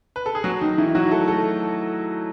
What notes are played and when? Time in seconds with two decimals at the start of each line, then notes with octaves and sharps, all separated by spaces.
0.16 B4
0.26 A4
0.35 G#4
0.44 F#3 F#4
0.61 D#3 D#4
0.78 E3 E4
0.89 E4
0.95 F#3 F#4
1.11 A3 A4
1.28 A3 A4